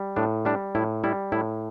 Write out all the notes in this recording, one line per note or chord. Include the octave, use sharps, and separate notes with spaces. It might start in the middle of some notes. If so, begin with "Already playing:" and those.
Already playing: G3
A2 D4
G3 D4
A2 E4
G3 E4
A2 E4